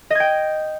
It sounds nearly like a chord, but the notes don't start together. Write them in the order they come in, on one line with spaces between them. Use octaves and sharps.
D#5 G#6 G5